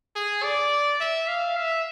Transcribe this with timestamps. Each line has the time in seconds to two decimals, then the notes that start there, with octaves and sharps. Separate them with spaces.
0.16 G#4
0.44 D5
1.00 E5
1.28 F5
1.57 E5